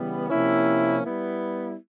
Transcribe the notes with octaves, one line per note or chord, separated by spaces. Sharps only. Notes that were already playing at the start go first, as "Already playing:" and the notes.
Already playing: C#3 E3 G3 B3
C3 F3 A#3 C#4 E4
G3 B3 E4